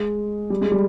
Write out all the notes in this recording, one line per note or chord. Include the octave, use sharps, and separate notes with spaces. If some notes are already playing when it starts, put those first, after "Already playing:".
Already playing: G#3
G3
G#3
G3